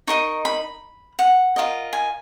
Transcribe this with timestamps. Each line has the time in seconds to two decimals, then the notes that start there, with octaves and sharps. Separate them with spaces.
0.07 D#4 A#4 D#5 C#6
0.45 B5
1.19 F#5
1.56 F4 A#4 D#5
1.93 G#5